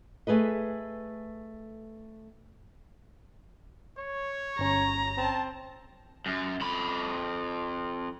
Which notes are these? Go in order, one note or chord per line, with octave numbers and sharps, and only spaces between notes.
A3 G#4 B4 D#5
C#5
G1 C#4 A#5
C4 A5
F#2
F2 B5